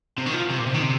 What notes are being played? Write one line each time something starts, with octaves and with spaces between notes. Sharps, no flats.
C3
D#3
F3
C3
A#2
C3
D#3
C3